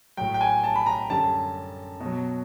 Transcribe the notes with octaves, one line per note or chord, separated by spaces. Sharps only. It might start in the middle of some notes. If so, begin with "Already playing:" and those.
A2 F#3 G5
G5
G#5
A5
B5
A#5
F#2 D3 G3 A5
B2
F#3